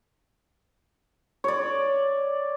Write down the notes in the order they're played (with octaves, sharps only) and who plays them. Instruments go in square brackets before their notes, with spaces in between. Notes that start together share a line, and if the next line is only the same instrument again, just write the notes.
[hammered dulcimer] C#5 D5